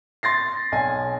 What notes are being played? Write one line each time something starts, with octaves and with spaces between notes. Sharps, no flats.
C6 A6 A#6 C7
B1 G#5